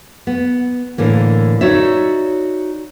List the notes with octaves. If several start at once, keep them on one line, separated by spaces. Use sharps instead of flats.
B3
A2 D3 E3 A#3
D#4 F#4 C#5 D5 E5